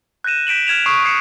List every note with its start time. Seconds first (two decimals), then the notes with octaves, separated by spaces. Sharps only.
0.24 F#6 G6 A#6 D#7 E7
0.47 G6 B6 D7 E7 F#7
0.67 F6 G#6 E7 F7
0.86 C#6 D#6 C7 D7
1.03 C#6 D#6 G#6 C7 C#7 E7